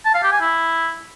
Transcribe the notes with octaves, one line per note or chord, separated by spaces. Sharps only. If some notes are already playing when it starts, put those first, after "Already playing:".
A5
F5
G4
G#5
E4